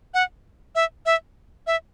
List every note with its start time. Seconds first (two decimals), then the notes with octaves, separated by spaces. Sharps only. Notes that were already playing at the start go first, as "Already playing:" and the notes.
0.14 F#5
0.75 E5
1.06 E5
1.67 E5